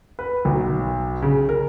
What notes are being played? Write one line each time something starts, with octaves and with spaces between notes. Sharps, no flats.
B4
B1
C#3
A#4